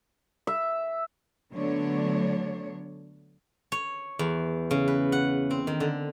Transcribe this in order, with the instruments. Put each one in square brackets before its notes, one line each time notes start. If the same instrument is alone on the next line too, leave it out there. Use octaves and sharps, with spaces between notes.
[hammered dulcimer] E5
[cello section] D3 F#3 A3 B3 D4 C#5
[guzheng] C#5
E2
C#3
B4
F#5
C4
D#3
D3